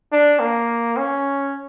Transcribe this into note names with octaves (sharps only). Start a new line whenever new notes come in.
D4
A#3
C#4